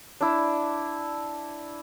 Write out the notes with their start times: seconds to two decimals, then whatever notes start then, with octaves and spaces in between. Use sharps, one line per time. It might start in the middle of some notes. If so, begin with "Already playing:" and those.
0.21 D4 E4